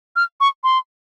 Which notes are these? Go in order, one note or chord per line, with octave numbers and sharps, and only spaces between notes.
F6
C#6
C6